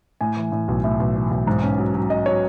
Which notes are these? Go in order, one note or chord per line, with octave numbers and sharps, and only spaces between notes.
A2 G#5
E3
A2
B1
A2 E5
B1
E3
B1
G#2
C#4
F#3
F#3
F#3 D#5
F#3 C#5